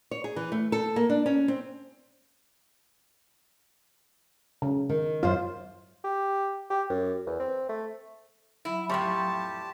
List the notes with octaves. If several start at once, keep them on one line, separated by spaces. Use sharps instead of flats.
C#5
G#4
E3
A3
A4
A#3
D4
C#4
C4
C#3
D#3
F#2 F4 C5
G4
G4
F#2
E2
C4
A3
F#3 E4 E5
F2 A2 G3 G4 A5 C6 C#6